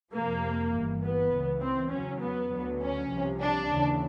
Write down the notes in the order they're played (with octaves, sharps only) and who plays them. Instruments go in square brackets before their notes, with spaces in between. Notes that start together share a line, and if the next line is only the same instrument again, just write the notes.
[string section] F2 C3 F3 A#3
G1 G2 E3
B3
C#2 C#3 E3
C4
E2 C#3 F#3 C#4
B3
D2 D3 F#3
C#4
C2 C3 F3
D4
D#2 C#3 E3